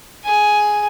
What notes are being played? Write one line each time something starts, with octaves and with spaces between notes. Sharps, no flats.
G#4 G#5